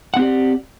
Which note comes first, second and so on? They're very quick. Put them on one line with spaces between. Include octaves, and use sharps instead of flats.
F#5 C4 G4 D5